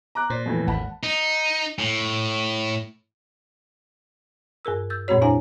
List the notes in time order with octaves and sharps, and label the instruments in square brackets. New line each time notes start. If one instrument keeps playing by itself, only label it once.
[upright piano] A#5 D6 F#6
[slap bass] A#2 [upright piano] C5 D5
[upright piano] F2 A2 E3
[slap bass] G#1 D#2 [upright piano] F#5 A5 B5
[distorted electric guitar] D#4
A2
[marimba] G2 G#4 A#4 E6
E6 G6 A6
F2 A#2 G#3 C4 F#4 C#5
D4 E4 C5 F5 G#5 A#5